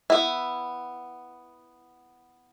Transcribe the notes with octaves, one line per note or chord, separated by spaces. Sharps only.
B3 E4